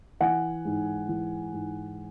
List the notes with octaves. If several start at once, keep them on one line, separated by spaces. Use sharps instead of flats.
E3 F#5 G#5
G#2
E3
G#2